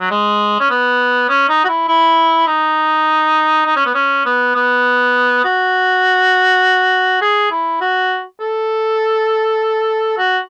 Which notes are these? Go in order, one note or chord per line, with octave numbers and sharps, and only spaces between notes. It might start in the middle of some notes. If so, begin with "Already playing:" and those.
F#3
G#3
C#4
B3
C#4
D#4
F#4
E4
E4
D#4
D#4
C#4
B3
C#4
B3
B3
F#4
G#4
E4
F#4
A4
F#4